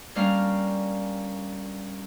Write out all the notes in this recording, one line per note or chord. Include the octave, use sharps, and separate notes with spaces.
G3 A#3 C#4 D4 F5